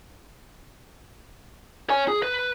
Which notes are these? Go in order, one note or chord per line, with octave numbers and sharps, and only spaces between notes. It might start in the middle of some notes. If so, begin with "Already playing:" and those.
C#5 G#5
G#4
B4